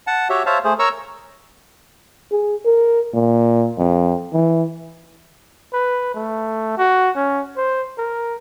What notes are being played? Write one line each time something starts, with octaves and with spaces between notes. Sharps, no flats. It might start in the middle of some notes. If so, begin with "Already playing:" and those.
F#5 A5
F#4 G4 C#5 E5
C5 C#5 E5 F5 A5
A3 G#4 C5
A#4 C#5 A#5 C#6 E6
G#4
A#4
A#2
F2
E3
B4
A3
F#4
C#4
C5
A#4